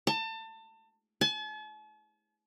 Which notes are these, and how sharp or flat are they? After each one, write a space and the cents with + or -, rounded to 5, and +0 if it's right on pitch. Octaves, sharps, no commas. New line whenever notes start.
A5 +30
A5 -45